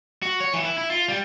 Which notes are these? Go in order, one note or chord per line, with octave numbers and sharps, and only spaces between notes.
F#4
C#5
E3
E4
E4
F4
G3